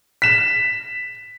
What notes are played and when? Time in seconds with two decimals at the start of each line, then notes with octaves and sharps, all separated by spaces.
0.22 B6 E7